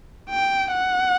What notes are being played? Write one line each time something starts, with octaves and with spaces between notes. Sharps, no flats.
G5
F#5